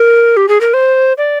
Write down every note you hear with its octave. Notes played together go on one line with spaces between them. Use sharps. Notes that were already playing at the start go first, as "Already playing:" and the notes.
Already playing: A#4
G4
G#4
A#4
C5
D5